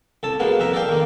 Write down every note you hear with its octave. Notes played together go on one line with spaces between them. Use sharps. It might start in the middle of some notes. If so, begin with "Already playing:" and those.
C2 A4 A5
B2 G#3 A#3 B3
C2 F2 E5 A#5
A4 A#4 D5 F5 G5
D#3 A#3